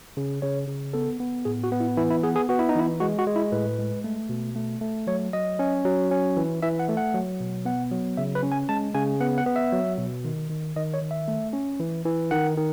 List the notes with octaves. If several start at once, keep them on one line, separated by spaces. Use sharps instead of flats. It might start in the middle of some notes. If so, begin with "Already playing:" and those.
C#3
C#3 C#5
C#3
B3 A4
B3
A2 G#4
F#4
B3
E4
E3 E4
E4
B3 G#4
G#4
B3 F#4
E4
D#4
E3 E4
G#3 F#4
F#4
G#3
E4
A2 B4
G#3
A3
B2
A3
A3
F#3 C#5
F#3 D#5
C#4
F#3
C#4
E3
E3 E5
F#5
A3
F#5
F#3
B2
B3 F#5
F#3
C#3 E5
B4
C#4
G#5
G#3 A5
C#3 G#5
B3 F#5
F#5
B3
E5
F#3
B2
D#3
D#3
D#3 D#5
C#5
D#3
E5
A3
C#4
E3
E3
D#3 F#5
D#3